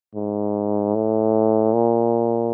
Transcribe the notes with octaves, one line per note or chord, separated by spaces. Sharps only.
G#2
A2
A#2